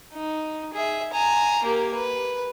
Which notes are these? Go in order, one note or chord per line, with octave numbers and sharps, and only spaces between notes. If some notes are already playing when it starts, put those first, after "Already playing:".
D#4
G#4 E5
G#5 A#5
A#3 G4
B4